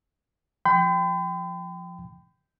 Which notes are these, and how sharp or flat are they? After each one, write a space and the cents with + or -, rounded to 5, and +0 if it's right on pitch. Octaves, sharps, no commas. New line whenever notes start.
F3 +0 G5 +0 B5 +45